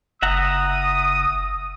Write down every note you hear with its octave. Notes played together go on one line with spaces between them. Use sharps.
F#1 E5 F#5 A#5 D#6